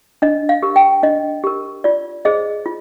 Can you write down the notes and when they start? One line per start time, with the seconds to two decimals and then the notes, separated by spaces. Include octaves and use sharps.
0.22 D4 D#5
0.49 F5
0.63 G4 A#4
0.76 G5
1.03 D4 D#5
1.44 G4 A#4
1.84 F4 D5
2.25 G#4 C5 D#5
2.66 F4